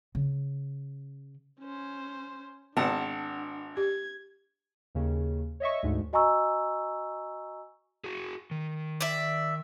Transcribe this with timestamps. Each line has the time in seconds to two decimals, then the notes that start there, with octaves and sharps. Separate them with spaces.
0.15 C#3
1.60 C#4 C5
2.77 G#1 B3 D4 F#5 A5
3.77 G4 G#6
4.95 D#2 C#3
5.60 C#5 D#5 E5 C#6
5.83 D2 G#2
6.13 F#4 D#5 G#5 A#5 C#6 E6
8.04 F#4 G#4
8.51 D#3
9.01 D5 E5